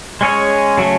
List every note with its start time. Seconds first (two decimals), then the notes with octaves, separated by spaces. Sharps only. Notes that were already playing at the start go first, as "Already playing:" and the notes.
0.21 G#3 C#4 G#4 C#5
0.77 C#3 F#3 A3 C#4